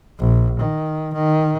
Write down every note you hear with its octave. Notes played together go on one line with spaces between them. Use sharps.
A#1
D#3
D#3